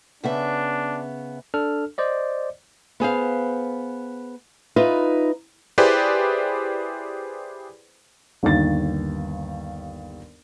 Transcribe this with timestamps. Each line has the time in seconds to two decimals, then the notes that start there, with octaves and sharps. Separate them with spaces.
0.24 C#3 B3 D4 E5
1.54 D4 A4 F6
1.98 C5 D5 D#5
3.00 B3 G#4 C5 F5
4.76 D#4 F4 B4 E5
5.78 E4 G4 G#4 B4 C5 D5
8.43 G1 D#2 A6